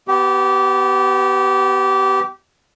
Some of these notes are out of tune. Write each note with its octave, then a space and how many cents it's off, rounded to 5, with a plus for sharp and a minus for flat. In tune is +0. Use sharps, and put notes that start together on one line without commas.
B3 +15 G4 -20